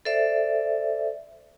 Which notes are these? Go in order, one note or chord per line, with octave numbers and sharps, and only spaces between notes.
A4 C5 D5 E5